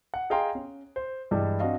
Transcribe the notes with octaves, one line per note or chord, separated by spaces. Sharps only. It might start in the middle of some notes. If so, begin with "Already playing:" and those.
F#5
G#4 D#5 F5 G5 A#5 C6
C#4
C5
G2 E3 G3 G#3
C4 D4 F#4 D#5 F5